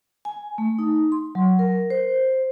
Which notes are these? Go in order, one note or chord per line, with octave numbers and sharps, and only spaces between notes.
G#5
A3
D#4
C6
F#3
A#4
C5